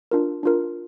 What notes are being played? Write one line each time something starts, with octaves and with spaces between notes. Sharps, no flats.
D4 F4 A#4
D4 F4 A#4